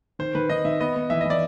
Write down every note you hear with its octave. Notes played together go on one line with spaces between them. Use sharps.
D#3 C5
D#3 B4
D#3 D#5
D#3 E5
B3 D#5
B3
E3 E5
D#5
E3 D5